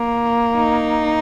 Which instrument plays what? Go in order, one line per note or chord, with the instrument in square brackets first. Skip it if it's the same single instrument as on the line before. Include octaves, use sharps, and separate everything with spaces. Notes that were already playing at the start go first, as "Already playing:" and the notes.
Already playing: [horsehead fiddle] A#3
[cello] D#4